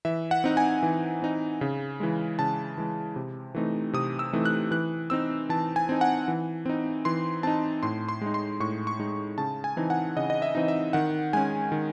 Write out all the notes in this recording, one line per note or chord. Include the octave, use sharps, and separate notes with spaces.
E3 E5
F#5
C4 D#4
G#5
E3
C4 D#4
C#3
E3 G#3
C#3 A5
E3 G#3
C3
E3 A3 C4 D#4
C3 D#6
E6
E3 A3 C4 D#4
F#6
E3 F#6
C4 D#4 E6
E3 A5
G#5
C4 D#4
F#5
E3
C4 D#4
E3 C6
C4 D#4 A5
A2 C6
C6
G#3 D#4
C6
A2 C#6
C#6
G#3 D#4
C#3 A5
G#5
E3 C4 D#4
F#5
C#3 D#5
D#5
E5
E3 C4 D#4
E5
D#3 F#5
G#3 C#4 G#5
D#3